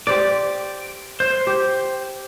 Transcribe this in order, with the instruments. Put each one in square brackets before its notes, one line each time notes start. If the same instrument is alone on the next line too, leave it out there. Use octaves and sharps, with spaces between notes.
[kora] G4 C5 D5 [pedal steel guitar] D6
[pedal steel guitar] C5
[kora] G4